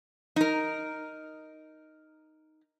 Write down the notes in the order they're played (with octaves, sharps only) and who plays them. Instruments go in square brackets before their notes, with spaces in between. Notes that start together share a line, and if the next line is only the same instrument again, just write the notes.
[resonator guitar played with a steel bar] D#4 A#4